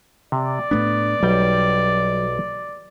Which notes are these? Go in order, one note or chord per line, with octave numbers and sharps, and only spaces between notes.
C3 D5
A2 A3 B3 D4
B1 F#3 G3 G5